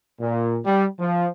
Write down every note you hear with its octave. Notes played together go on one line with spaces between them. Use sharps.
A#2
G3
F3